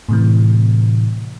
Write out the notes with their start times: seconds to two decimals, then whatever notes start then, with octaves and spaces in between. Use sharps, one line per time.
0.09 A2 C3 E3